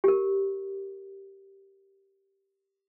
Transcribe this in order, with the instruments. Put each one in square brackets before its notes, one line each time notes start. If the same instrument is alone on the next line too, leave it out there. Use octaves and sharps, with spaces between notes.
[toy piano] G4 A#4